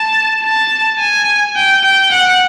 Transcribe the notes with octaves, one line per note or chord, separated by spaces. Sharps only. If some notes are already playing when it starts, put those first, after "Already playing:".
Already playing: A5
A5
G#5
G5
G5
F#5